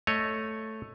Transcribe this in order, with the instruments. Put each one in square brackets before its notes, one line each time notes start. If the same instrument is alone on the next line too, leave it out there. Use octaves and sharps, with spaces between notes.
[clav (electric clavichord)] A3 C#5 D#5